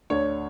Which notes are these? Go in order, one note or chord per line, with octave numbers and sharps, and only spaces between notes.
D2 D3 C#5